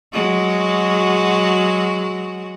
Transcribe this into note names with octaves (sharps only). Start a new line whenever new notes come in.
F#3 G#3 F#4